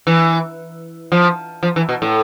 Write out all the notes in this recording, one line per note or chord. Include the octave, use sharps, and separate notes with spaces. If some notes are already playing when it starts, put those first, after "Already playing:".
E3
F3
F3
E3
B2
A2